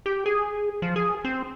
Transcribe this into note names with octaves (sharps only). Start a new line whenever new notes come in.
G4
G#4
F3
G#4
C4